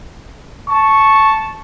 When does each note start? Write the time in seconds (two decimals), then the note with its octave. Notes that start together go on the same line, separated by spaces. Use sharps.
0.69 A5 C#6